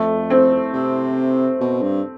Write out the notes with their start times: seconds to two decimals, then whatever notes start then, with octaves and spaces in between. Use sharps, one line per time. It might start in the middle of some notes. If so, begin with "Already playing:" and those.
Already playing: F2 A3
0.30 C4
0.73 C3
1.61 B2
1.82 G2